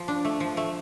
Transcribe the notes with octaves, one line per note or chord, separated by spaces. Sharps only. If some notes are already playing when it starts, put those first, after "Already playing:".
Already playing: F3
D4
A3
F3
A3